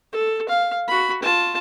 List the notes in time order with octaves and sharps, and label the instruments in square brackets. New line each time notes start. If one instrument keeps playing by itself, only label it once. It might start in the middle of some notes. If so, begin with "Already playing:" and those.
[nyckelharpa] A4
F5
F#4 B5
F4 A5